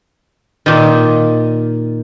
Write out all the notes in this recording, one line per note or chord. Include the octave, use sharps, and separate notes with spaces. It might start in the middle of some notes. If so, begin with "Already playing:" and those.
A#2 D#3